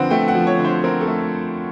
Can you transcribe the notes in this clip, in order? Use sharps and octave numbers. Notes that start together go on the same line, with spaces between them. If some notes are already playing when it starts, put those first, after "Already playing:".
Already playing: D3 F3 C4 B4 F#5
A3 G5
F#5
F3
C#5
D3
C5
C4 A#4
A4
A3